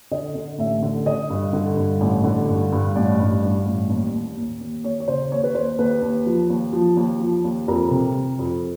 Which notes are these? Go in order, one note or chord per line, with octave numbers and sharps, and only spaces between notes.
D3 D#5
D3
A1 E5
D3
D3 D#5
G2
D3
G2
A1
D3
G2
G2
A1 D5
G2
G2
A1
D#2
D#2
D#2
D#2
D#2 C#5
C#5
C#3 C5
D#2 C#5
B4
D#2 C5
D#2 B4
D#2
F3
D#2
F3
D#2
F3
D#2
F2 A#4
C3
C3
F2